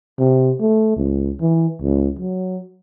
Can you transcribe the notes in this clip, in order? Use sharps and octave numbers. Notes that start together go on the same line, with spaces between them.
C3
A3
C#2
E3
C#2
F#3